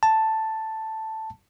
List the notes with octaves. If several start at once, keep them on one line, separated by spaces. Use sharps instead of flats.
A5